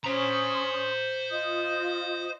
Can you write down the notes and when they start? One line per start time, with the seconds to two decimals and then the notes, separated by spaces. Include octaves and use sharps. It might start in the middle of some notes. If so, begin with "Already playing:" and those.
0.04 C#4 C5 A#5 C6 D#6
1.30 F4 D#5 D#6